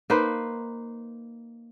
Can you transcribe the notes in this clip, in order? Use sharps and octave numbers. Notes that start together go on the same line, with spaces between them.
A#3 D#4 B4 C5